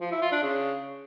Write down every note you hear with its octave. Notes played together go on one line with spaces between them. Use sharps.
F3
E4
F4
D4
C#3